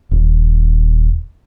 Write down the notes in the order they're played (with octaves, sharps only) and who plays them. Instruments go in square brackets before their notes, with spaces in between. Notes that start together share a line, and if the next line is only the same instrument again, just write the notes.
[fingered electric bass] D#1